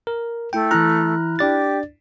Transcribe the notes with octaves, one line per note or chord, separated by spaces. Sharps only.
A#4
A3 E4 G5
E3 E4 A#5 F6 F#6
D4 G4 D5 A6